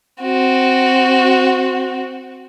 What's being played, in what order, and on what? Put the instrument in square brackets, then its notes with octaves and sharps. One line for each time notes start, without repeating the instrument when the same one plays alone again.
[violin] C4 F#4